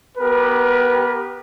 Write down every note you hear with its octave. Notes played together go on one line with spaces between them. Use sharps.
B3 G4 A#4 B4